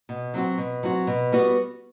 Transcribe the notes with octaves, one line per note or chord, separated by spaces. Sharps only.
B2
F#3 C4 F#4
B2
F#3 C4 F#4
B2
G3 B3 F#4